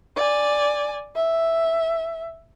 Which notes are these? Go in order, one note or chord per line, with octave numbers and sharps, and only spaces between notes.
D5 G#5
E5